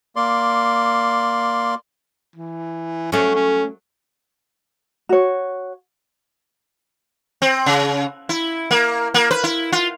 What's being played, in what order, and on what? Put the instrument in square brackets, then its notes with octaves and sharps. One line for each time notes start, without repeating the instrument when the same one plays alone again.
[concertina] A#3 D5 C6
[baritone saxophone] E3
[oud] F#3 A3 [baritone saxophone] C#4
[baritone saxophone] C#4
[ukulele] F#4 C#5
[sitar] C4
C#3
E4
A#3
A#3
B4
E4
F4